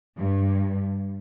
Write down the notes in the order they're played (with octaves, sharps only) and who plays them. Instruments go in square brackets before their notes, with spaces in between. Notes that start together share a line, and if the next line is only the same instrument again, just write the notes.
[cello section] G2